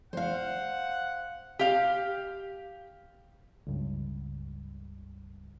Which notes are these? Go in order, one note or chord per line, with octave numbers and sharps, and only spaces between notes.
C5 F5 F#5
G4 F5
C#2 G2